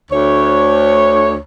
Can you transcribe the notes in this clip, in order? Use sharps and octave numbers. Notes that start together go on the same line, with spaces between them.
D2 C#5